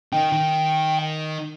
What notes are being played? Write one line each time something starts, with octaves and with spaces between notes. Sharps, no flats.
D#3 D#4 G5
D#3